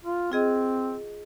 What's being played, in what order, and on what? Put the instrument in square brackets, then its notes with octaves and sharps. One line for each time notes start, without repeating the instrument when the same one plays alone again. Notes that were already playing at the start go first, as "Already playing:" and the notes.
[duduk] F4
[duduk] C4 [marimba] F4 G#4 D#5